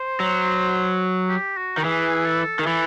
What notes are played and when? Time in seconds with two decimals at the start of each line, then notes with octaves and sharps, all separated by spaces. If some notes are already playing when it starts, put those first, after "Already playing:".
Already playing: C5
0.20 F#3
1.29 G4
1.57 F#4
1.77 D#3
1.84 E3 G#4
2.25 A4
2.59 D#3
2.62 G#4
2.67 E3 A4